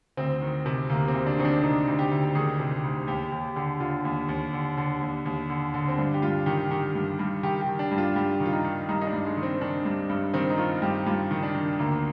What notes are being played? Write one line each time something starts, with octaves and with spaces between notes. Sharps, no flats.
D2 C4
D#3
C3
D2 A#3
C4
D2
D4
D#3 C4
D4
C3 D#4
D2
G4
D2
D#3 G#4
C3
D2
D#2 G4
D#2 G4
D3 G4
D3 F4
D#2
D#2
D3
D3
D#2
D#2
D3
D3
C4
G2 D4
G4
G2 F4
D#3 G4
D#3 G4
G2
G2
D#3 G4
G4
D#3
D4
G2
F4
G2 G4
D#3
F4
D#4
D#3
G2 D#4
D#4
D4
G2
G#3
D#3
C4
D#3 D4
G2
G2
D#3 C4
D#4
D#3 F4
G2 G4
G2 F4
D#3
D4
D#3
D2 A#3